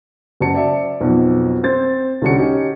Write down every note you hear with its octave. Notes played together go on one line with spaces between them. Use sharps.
F#1 F#4 A5 C#7
D5 E5 A5
B1 F2 B2
C4 C5 A6
C2 D3 C#4 F#4 C#7
C#4 D#4 G4